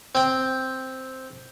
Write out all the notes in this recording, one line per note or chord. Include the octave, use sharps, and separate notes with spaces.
C4 G5